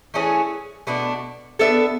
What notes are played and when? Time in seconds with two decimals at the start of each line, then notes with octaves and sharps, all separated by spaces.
0.14 E3 A3 C#4 G#4
0.87 B2 A3 D4
1.59 B3 D4 A4 E5